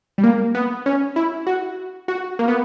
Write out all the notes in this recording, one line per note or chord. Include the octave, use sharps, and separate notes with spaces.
G3
A#3
B3
C#4
E4
F#4
F#4
A#3
B3